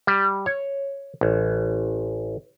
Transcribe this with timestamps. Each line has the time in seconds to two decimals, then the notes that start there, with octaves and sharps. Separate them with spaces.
0.07 G3
0.46 C#5
1.21 A1